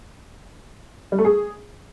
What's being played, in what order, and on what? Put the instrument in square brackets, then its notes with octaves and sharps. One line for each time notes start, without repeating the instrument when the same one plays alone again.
[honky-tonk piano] G3
A3
G#4